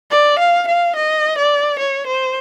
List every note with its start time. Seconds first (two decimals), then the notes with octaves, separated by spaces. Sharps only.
0.11 D5
0.39 F5
0.67 F5
0.96 D#5
1.38 D5
1.79 C#5
2.07 C5